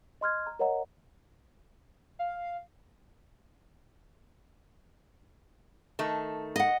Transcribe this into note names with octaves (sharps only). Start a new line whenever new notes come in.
D#5 C6 F6 G#6
A#5
A#4 C#5 D#5 F#5 A#5
F5
D#3 A3
D#5 F#5